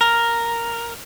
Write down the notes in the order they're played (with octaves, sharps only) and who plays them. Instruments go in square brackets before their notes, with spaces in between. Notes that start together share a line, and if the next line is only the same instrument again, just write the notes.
[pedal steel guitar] A#4